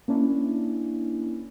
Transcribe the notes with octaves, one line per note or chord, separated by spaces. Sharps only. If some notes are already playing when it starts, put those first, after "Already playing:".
A#3 C#4 D4 E4